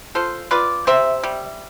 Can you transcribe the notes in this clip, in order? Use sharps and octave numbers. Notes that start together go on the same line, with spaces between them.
F4 A4 C5
F4 B4 D5
C3 C5 E5
G3